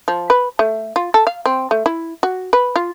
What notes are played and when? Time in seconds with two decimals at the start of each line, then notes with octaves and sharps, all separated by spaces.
0.08 F3
0.30 B4
0.59 A3
0.96 F4
1.14 A4
1.27 F5
1.46 C4
1.71 A3
1.86 E4
2.23 F#4
2.53 B4
2.76 F4